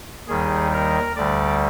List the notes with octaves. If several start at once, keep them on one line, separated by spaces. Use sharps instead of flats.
D#2 D#3 G3 G#4
A#4
D2 D3 G3 D5